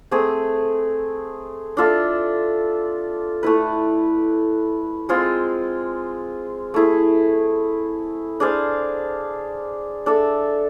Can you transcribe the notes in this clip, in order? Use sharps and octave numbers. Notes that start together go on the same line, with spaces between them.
A3 C4 G#4
D4 F4 A4 E5
A3 E4 B4
G#3 C4 F4 G#4
A3 E4 G#4
D4 G#4 C5 F5
D4 A4 E5